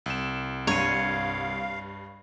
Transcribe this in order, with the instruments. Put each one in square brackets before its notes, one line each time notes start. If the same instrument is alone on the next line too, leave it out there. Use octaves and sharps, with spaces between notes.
[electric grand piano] C2 E7
[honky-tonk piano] G2 D#7 [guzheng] C#5 [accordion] F5